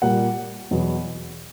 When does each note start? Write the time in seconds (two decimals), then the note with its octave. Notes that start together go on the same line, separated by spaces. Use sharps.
0.02 A#2 G3 A#3 F#5
0.71 E2 B2 F#3 B3